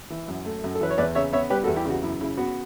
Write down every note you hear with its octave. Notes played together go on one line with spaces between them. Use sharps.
E3
F#2
A3
F#2
A4
E3 B4
C#5
E2 B4 D5
C#3 C#5 E5
B3 C#5 E5
G3 G4 B4
F#4 A4
E2
E4 G4
C#3 F#4
F#2 E4
C#3 E4
B3 F#4